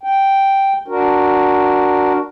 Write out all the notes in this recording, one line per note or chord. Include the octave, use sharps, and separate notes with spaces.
G5
D4 F#4 A#4